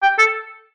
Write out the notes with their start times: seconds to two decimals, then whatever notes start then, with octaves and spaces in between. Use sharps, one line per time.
0.03 G5
0.18 A4